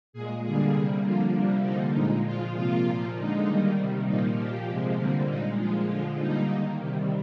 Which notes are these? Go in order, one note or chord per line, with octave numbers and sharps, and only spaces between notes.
A#2 G#3 G#4
D3 G3 A#3 G#4
C3 G3 A#3
D3 F3 A#3 F4
C3 G3 A#3 D4
D3 F3 A#3 D#4
A#2 G#3 D#4
A#2 F3 G#3 F4
C3 F3 A#3 F4
A#2 F3 A#3
D3 G#3 D#4
D#3 G3 A#3
C3 D#3 G3
A#2 F3 A#3 D#4
A#2 F3 A#3 G4
C3 F3 G#3
D3 G3 A#3 C4
A#2 G#3 D#4
A#2 F3 G#3 F4
D3 F3 G#3 F4
D3 G3 A#3 D#4
D#3 A#3
C3 D#3 G3